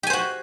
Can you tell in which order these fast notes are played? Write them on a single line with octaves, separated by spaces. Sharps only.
G4 G#5 C5 F#4